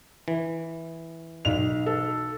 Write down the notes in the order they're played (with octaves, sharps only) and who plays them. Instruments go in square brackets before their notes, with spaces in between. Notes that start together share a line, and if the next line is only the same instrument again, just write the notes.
[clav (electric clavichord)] E3
[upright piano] B1 F7
[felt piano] A4